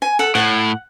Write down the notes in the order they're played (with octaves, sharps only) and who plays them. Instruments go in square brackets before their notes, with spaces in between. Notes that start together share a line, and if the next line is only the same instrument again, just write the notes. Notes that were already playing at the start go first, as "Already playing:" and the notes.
[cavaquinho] G#5
A4 F#5
[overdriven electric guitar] A2 [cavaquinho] F#5